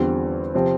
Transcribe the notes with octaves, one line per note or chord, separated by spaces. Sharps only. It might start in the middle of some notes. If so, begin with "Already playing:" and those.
Already playing: E2 D3 G3 C4 F4
C3 F3 C4